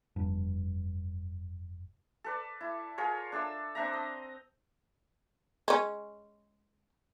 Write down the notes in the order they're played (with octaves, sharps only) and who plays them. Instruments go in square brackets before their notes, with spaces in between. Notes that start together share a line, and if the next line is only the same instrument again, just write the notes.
[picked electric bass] F1 G2
[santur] A4 B4 D5
E4
F4 G#4 A#4 C#5
D4 A4 E5 E6
C4 D4 E5 A#5
D#5
[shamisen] G#3 C#4